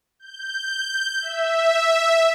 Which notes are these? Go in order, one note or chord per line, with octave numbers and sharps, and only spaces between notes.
G6
E5